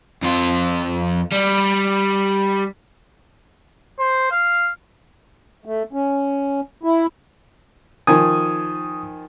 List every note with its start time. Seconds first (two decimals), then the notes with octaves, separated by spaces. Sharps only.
0.22 F2 F4
1.32 G3
3.99 C5
4.32 F5
5.65 A3
5.93 C#4
6.83 E4
8.07 D#3 F3 G#5 D#6